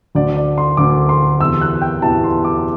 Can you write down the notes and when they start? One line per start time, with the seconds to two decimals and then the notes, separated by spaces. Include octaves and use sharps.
0.15 D2 D3 D5
0.36 D5
0.58 C6
0.77 D2 D3 D6
1.09 C6
1.40 E2 C3 E3 E6
1.61 F#6
1.81 G5
2.02 E2 C3 E3 A5
2.24 C6
2.44 D6